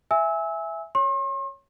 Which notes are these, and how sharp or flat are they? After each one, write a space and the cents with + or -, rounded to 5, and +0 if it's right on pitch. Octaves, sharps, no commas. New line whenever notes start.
E5 +5 G#5 -5 E6 -25
C#5 +0 C6 +45